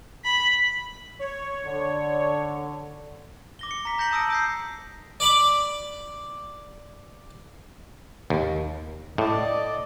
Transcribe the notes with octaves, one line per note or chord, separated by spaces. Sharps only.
B5
C#5
D3
D6 A#6 G7
C#7
A#5 B6
A#5 G6 A#6 C#7 F#7
A5 A#5 D#6 E6 A#6 D7
D#6 G6 C7
D5 B5 D6
D#2
A2 D5 D#5